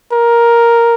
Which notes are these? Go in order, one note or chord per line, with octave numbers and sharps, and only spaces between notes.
A#4